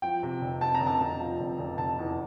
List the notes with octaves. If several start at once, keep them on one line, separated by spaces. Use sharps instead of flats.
F3 G5
C3
F1
C3 A5
A#5
F1
A5
F1
F3
F1
F1
F1 A5
E2